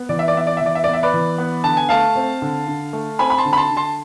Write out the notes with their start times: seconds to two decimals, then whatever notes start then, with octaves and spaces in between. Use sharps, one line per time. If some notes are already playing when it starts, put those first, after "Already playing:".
Already playing: B3
0.09 E3 D5
0.19 E5
0.28 D5
0.35 B3 E5
0.47 D5
0.57 E5
0.61 E3 D5
0.75 E5
0.84 B3 D5
0.93 E5
1.03 B4 D5
1.13 E3
1.38 B3
1.64 D3 A5
1.77 G#5
1.89 A3 F5 A5
2.16 C4
2.42 D3
2.68 D3
2.93 A3
3.19 C4 G#5 B5
3.30 B5
3.38 A5 C6
3.45 D3
3.53 B5
3.57 A5 C6
3.71 D3
3.77 A5 C6